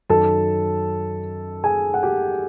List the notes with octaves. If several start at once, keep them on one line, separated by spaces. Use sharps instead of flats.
F#2 D#3 F#3 A4 A5
G#4 G#5
F#5
G4 G5